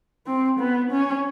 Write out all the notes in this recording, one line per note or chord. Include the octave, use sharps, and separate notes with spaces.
C4
B3
C#4